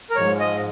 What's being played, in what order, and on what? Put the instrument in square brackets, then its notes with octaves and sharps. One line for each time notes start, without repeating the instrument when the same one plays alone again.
[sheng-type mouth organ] A#4
[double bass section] G#2 F3 G#3 [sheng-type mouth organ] C#5
[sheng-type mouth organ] D#5